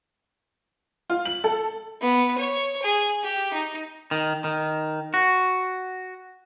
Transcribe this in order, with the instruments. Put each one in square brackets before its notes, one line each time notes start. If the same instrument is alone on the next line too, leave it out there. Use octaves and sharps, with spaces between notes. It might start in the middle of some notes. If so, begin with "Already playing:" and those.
[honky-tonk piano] F4
F#7
A4
[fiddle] B3
C#5
G#4
G4
D#4
[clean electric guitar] D#3
D#3
F#4